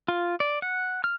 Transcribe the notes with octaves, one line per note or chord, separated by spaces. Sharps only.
F4
D5
F#5
F6